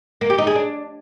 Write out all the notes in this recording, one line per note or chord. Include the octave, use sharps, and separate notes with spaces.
A#3
G4
D#4
G#4
D4